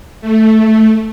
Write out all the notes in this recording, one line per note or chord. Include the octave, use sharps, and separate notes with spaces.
A3